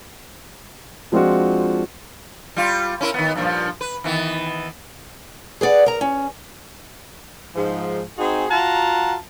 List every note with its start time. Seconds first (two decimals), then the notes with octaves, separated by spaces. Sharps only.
1.12 F3 G#3 C4 D4 F4 F#4
2.56 G3 F4
3.01 C#4 E4 A#4
3.14 D#3 B3
3.36 G2 A#2 F3
3.81 B4
4.04 D#3 E3 B3
5.61 G#4 B4 D5 F#5
5.86 A#4 A#5
6.01 C#4
7.56 G#2 F3
8.18 C4 D#4 F#4 G#4
8.50 F4 F#4 F#5 A5 A#5